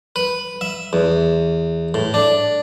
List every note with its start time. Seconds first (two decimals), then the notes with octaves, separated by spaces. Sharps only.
0.16 B4
0.61 E5
0.93 E2
1.94 A2
2.14 D4